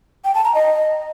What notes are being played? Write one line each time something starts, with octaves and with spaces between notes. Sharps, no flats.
G5
A5
A#5
D#5